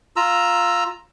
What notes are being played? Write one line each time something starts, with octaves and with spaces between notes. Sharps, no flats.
F4 A#5 E6